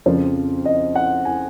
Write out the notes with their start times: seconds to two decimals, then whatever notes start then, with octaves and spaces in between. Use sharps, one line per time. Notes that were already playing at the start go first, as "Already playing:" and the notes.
0.06 F2 C#3 F3 C4 C5
0.65 D#5
0.96 F#5
1.25 G#5